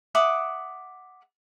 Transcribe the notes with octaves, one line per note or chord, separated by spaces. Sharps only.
E5 F#5 D6 D#6